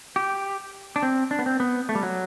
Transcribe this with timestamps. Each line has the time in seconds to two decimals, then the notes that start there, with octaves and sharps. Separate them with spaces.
0.16 G4
0.96 D4
1.03 C4
1.31 D4
1.39 B3
1.46 C4
1.60 B3
1.89 A3
1.95 G3
2.03 F#3